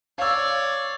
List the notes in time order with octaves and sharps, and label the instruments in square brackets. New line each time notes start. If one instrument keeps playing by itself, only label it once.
[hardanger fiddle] C#5 D5 [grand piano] F5 E6